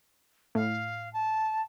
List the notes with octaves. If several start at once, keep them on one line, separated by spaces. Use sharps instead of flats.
A2 F5
A5